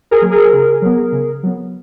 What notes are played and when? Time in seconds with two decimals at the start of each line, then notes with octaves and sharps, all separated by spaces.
0.11 G#4 A#4
0.22 F#3 A#3
0.31 G#4 A#4
0.52 C#3
0.82 F#3 B3
1.12 C#3
1.43 F#3 B3